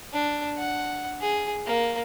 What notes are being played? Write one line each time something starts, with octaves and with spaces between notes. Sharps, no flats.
D4
F#5
G#4
A#3